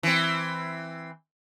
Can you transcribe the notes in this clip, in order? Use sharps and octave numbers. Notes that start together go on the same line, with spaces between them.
E3 C4